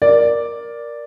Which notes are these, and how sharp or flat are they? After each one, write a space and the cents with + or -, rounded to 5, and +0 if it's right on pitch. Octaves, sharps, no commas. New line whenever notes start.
A#4 +10 D5 +0